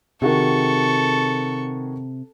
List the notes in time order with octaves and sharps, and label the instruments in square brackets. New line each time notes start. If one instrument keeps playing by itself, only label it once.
[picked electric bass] C3 [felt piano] D#3 F#4 G#4 [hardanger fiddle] A4 C#6